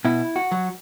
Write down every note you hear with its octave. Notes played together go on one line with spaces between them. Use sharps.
B2 E4
F#4
F#3